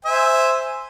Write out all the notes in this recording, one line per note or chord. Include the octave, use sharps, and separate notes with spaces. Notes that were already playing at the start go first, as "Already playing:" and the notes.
C5 E5 G#5